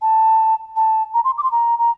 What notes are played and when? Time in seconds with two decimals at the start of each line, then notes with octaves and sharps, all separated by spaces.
0.02 A5
0.76 A5
1.14 A#5
1.24 C6
1.38 D6
1.43 C6
1.51 A#5
1.79 A#5